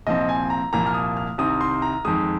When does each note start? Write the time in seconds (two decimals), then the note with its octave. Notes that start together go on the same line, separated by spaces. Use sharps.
0.07 C2 A#2 F3 C4 D#5
0.29 G#5
0.50 A#5
0.73 C2 A#2 F3 A#3 A#5
0.87 F6
0.94 D#6
1.17 F6
1.38 C2 C3 D#3 C4 D#6
1.61 C6
1.82 A#5
2.05 F2 D#3 G#3 D#6